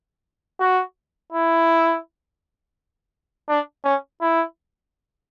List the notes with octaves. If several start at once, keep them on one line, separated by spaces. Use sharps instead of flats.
F#4
E4
D4
C#4
E4